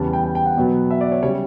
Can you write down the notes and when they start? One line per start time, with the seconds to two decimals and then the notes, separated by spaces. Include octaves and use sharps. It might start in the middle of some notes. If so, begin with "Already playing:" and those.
Already playing: E2 C#3 E3 G3 B3 A5
0.13 G5
0.24 G5
0.35 G5
0.46 F#5
0.57 B2 F#3 B3
0.91 E5
1.01 D5
1.12 C#5
1.22 C#3 G3 C#5